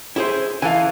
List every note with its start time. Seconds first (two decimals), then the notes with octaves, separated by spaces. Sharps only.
0.16 E4 G#4 C5
0.62 E3 A4 F5 G#5